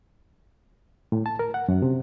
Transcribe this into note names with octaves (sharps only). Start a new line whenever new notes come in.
A2
A5
A#4
F#5
F#2
C3